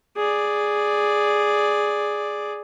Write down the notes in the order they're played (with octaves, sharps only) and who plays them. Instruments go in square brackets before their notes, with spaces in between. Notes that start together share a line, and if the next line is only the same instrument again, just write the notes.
[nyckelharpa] G#4 D5